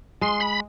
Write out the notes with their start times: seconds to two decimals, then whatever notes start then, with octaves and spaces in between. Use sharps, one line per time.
0.21 G#3 C6
0.40 B5